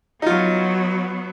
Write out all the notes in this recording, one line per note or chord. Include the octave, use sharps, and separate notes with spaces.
F#3 B3 D#4 F4